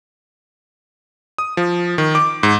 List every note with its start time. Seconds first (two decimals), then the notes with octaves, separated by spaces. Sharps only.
1.38 D#6
1.57 F3
1.98 D#3
2.15 D6
2.43 G#2